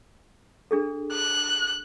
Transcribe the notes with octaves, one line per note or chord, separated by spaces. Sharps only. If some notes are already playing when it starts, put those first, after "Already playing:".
D4 G#4 A4
F#6